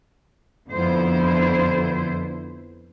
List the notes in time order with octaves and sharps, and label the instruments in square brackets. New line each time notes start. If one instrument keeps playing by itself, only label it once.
[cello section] F2 D3 B3 E4 C5